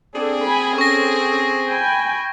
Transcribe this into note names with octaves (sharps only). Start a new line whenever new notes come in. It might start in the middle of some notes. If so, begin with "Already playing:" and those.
C4 D4 G#4 A4
G#5 B5
C#4 A4 C#6 A#6
G5 G#5 B5